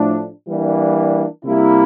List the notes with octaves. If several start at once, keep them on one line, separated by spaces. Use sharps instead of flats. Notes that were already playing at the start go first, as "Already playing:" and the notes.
Already playing: A2 F3 A3 D4
E3 G3 A#3 D4
C3 G3 A#3 E4